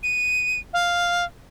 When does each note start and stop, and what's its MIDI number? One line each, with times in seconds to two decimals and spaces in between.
0.03 0.59 99
0.73 1.25 77